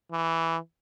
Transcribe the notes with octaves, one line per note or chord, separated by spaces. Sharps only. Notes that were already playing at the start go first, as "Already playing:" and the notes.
E3